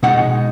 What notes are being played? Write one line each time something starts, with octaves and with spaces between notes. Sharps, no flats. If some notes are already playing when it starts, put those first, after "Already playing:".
B2 G#3 D#4 F#5